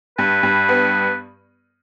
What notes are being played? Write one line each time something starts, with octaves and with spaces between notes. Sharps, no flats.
G2 B4
G2
B3